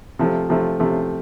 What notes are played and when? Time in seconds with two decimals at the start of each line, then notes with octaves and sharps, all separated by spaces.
0.19 C3 F3 A3
0.50 C3 F3 A3
0.80 C3 F3 A3